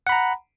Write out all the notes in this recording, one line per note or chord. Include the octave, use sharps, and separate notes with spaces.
F#5 A#5 B5